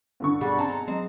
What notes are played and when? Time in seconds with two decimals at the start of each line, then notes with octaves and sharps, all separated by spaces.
0.20 G2 D3 C#6
0.41 B2 G3 G#4 F#5
0.58 C4 D#4 A4 A5 A#5
0.88 F#3 G#3 C4 D#5